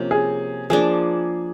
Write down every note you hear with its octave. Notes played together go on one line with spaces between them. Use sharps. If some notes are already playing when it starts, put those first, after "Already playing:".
Already playing: C3 F3 A#3 C#4
G#4
F3 A#3 D4 G#4